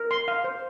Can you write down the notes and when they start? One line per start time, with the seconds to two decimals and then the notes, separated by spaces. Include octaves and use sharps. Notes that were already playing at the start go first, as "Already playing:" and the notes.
Already playing: A#4
0.11 C6
0.28 F5
0.44 C5